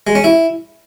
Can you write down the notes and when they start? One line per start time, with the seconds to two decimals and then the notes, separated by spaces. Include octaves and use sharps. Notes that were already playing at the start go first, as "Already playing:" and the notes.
0.07 G#3
0.15 C#4
0.24 E4